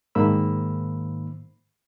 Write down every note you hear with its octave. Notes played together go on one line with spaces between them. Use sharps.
G#2 D#3 A#3 C5 B5 E6